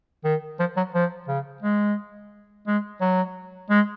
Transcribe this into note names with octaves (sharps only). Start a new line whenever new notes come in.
D#3
F3
F#3
F3
C#3
G#3
G#3
F#3
G#3